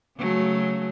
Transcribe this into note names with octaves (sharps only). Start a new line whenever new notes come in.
C#3 F#3 A3